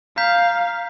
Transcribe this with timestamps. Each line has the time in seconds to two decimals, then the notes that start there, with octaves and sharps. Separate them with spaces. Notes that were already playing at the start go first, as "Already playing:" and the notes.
0.18 F5 A#5 G6 B6